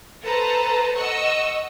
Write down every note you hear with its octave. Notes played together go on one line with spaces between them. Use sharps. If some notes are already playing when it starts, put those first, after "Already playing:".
A4 B4 C5 A5 A#5
D#5 F#5 C#6 E6